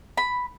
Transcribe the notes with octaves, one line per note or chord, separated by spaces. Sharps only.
B5